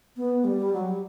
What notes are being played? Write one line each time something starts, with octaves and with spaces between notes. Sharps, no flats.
B3
G3
F#3
G3